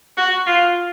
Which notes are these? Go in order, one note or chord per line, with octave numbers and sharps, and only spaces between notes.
F#4
F4